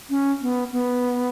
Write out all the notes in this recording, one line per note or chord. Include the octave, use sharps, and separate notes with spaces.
C#4
B3
B3